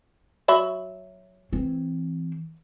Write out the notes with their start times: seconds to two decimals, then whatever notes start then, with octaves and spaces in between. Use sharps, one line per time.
0.48 F#3 E5 B5
1.53 E3 C4